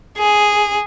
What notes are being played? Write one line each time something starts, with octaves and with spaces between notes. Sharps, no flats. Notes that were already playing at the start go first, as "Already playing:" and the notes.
G#4